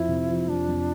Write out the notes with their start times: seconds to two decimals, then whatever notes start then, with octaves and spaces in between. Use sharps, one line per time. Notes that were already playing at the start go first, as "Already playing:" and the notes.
Already playing: F2 F3 E4
0.09 C3
0.29 F3
0.48 F2 D4
0.68 F2